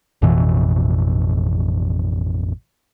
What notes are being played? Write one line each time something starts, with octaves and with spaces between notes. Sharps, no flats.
A1 F2 B2 E3